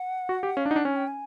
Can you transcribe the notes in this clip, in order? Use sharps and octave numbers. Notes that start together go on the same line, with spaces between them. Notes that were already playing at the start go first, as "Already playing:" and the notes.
Already playing: F#5
F#4
G4
C#4 F5
D4
D#4 F#5
D4
C#4 G#5
G5
G#5